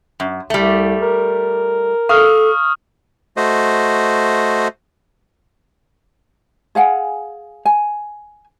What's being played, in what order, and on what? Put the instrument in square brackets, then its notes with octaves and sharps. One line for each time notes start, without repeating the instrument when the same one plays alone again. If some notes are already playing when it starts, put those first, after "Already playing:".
[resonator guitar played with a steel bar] F#2
[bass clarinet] C2 [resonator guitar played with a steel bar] G3 A3
[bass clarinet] A#4
[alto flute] A4 [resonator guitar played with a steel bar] F5 [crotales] C#6 D#6 F6
[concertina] A3 F#4 C5 D#5
[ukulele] G#4 F5 F#5 G#5
G#5